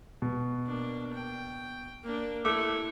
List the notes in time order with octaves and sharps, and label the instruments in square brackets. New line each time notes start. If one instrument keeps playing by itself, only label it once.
[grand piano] B2
[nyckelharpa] A#3 D4
G5
A#3 D4
[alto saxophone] A3 [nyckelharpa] E4 [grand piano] D6